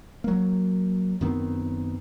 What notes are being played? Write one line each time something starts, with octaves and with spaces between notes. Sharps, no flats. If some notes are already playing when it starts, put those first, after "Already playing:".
F#3 A#3
F#2 D#3 B3 C4